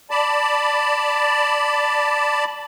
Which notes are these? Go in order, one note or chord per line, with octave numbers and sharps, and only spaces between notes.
D5 A5 B5